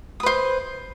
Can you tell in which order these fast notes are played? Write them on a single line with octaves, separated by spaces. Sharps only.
D#6 B4 C5